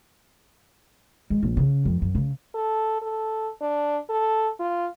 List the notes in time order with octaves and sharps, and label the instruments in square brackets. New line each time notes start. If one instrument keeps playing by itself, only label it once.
[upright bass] G#3
A#1
C#3
F2
F#2
C#3
[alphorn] A4
A4
D4
A4
F4